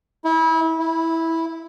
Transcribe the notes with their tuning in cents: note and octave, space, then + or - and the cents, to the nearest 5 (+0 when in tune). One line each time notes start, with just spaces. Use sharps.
E4 -30
E4 -10